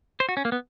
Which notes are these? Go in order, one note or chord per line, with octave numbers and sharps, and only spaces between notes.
C5
F#4
C#4
A#3
B3